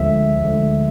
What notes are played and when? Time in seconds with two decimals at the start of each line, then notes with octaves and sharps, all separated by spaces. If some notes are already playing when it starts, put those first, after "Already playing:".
Already playing: D2 D3 F3 G#3 E5
0.44 D2 D3 F3 G#3